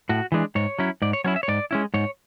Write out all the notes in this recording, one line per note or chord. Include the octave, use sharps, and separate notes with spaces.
A2 F#4
E3 G#3 D4
G#2 C#5
F#3 C#4 E4
G#2 D5
C#5
F#3 C#4 E4 C#5
E5
C#5
G#2 D5
G#3 C#4 E4
G#2 C#5